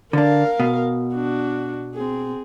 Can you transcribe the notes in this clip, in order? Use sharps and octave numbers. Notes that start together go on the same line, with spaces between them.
D3 D4 A#4 F5
B2
D4 F#4
C4 G#4